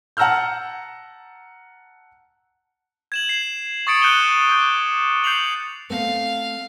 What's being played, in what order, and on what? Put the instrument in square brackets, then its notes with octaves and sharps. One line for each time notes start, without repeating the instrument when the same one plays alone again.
[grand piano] F#5 A5 A#5 E6 F6 G6
[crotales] G#6 E7 F#7
C7
C#6 D#6 A6 C#7 D7
F#6 G6 C#7 D#7 E7 G7
D6 G6
G6 C7 C#7 F7 F#7
[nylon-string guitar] A3 B3 C4 [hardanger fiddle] F5